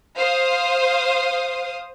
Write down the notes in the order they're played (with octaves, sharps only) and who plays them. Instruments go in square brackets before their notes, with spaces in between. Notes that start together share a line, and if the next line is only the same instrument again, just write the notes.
[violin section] C5 F5 D#6